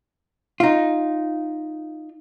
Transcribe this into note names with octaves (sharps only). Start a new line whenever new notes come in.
D#4 F4